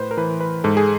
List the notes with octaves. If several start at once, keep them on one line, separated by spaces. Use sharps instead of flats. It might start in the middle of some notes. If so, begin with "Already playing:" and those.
Already playing: A2 B4 C5
A#4
E3 B4
B4
G#2 A4
G#4